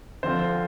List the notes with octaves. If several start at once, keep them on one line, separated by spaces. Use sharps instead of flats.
D3 F3 C4 F4 C5